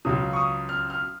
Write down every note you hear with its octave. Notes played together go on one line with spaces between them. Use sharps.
C#2 C#3 F#3 D#6
C#6
D#6
F6
F6